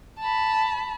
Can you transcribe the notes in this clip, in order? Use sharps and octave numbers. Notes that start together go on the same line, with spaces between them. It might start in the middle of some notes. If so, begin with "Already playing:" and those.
A5 B5